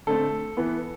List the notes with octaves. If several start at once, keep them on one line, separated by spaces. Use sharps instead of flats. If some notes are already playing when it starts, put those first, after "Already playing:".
D3 A3 C4 A4
E3 B3